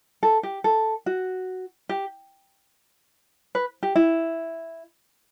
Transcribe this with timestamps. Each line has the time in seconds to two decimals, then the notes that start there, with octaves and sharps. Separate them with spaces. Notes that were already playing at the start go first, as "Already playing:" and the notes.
0.23 A4
0.43 G4
0.64 A4
1.06 F#4
1.89 G4
3.55 B4
3.83 G4
3.95 E4